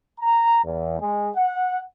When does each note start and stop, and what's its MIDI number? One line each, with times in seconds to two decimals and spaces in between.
0.19 0.60 82
0.64 0.96 40
0.99 1.30 56
1.35 1.80 78